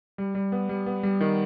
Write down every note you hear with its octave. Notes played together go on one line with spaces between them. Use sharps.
G3
G3
B3
G3
B3
G3
D#3